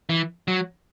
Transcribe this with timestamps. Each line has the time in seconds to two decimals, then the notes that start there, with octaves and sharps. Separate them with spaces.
0.09 E3
0.48 F#3